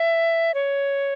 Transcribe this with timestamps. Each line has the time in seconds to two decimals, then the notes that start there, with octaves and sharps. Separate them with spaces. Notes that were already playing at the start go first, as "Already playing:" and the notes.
Already playing: E5
0.54 C#5